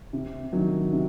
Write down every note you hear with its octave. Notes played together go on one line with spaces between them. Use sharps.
C3
D#3 F#3
C3